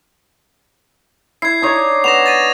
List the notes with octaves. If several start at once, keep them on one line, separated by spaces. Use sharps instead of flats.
E4 G#6 C7
D4 D#4 C#5
B3 A#6 E7 F7
A6 A#6 D#7